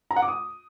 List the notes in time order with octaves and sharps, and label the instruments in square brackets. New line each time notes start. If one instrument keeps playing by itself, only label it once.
[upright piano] A#5
F#5
D6
D#6